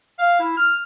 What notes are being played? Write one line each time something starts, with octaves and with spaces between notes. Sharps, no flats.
F5
E4
F6